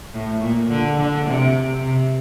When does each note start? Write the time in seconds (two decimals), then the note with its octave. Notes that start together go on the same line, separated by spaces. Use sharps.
0.14 A2
0.41 A#2
0.70 D3
0.97 D3
1.25 C3
1.81 C3